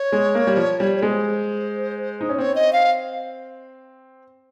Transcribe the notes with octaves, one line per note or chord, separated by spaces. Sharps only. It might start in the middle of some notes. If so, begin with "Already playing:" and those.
Already playing: C#5
G#3
A#3
G3
F3
G3
C#5
G#3 C5
D#4
C#4
C4 C#5
D#5
F5